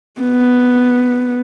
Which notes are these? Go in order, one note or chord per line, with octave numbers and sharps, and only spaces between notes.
B3